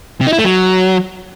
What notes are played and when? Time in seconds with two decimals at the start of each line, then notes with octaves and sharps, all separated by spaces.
0.21 C3
0.27 D#4
0.33 E4
0.39 A3
0.44 F#3